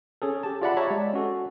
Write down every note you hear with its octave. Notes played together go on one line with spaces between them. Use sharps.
C#4 G#4 A4
G4 A5
F4 G#4 D5 E5 F#5 B5
G4 C#5 E5 A5 A#5 C#6
G#3 D5
C#4 F#4 A4